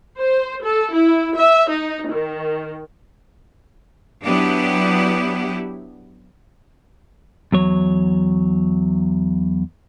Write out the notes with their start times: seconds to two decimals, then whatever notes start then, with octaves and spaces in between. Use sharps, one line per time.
0.16 C5
0.63 A4
0.92 E4
1.34 E5
1.70 D#4
2.10 D#3
4.23 F#3 B3 D4 E4 G4
7.52 E2 F#3 C#5